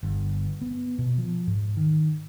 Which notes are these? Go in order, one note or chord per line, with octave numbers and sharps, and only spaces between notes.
G1
B3
B2
F3
G#2
D#3